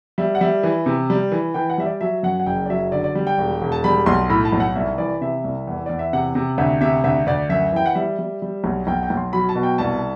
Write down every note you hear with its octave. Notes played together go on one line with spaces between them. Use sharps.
G3 E5
F#5
G3 E5
E3
C3
G3
E3
E3 G5
F#5
G3 E5
D5
F#3 E5
F#2 F#5
F#5
F#1 G5
D5
F#3 E5
D3 D5
D5
G3
G5
E1
E1
A5
G3 B5
B1 C6
A2 B5
A5
B1
F#5
C2 E5
E3 D5
C3 E5
C2
E2
E2 D5
E5
C3 F#5
C3
D2 E5
C3 E5
D2 E5
D2 D5
F#2 E5
E3 G5
F#5
G3 E5
G3
G3
B1
B1 G5
G5
B1
C6
F#3 B5
A5
B2
G5
C2 A5